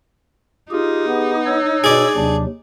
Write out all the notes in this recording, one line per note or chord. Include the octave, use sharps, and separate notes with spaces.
D#4 F4 G4 G#4
B3
C#5 E6
B2 G#4 D5
D#2 C3 F#3 D4